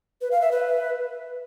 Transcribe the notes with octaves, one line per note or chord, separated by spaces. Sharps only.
B4
F5
E5
B4